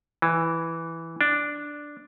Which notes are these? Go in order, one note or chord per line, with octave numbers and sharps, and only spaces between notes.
E3
D4